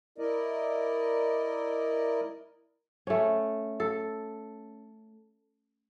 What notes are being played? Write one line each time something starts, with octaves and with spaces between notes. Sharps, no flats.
E4 A#4 D5 D#5
A3 C#4
A4